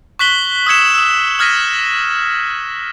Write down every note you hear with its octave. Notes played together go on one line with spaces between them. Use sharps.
C#6 F#6 B6 F#7 G7
D#6 E6 F#6 G#6 C#7 E7
D#6 E6
D#6 F6 G#6 A#6 B6 D#7